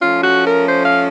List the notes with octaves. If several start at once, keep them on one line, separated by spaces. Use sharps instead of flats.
F3 A3 C#4 F4
F#4
A#4
C5
F5